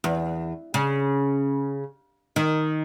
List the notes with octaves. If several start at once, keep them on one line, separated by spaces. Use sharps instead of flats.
E2
C#3
D#3